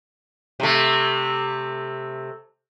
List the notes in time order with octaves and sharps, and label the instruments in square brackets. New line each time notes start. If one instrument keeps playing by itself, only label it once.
[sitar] C3 A3